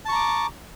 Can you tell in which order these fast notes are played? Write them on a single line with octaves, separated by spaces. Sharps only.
A5 C#6 A#5 D6